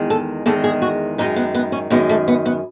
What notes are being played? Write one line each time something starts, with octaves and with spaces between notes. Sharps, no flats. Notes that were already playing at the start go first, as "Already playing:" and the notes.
Already playing: E2 D#3 G#3
A4
E2 D#3 G#3 A4
G#4
F#4
F#2 D#3 G#3 D#4
B3
B3
C#4
F#2 D#3 G#3 B3
A3
B3
B3